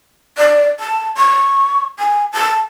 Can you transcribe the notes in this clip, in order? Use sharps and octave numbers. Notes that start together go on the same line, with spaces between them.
D5
A5
C#6
G#5
A5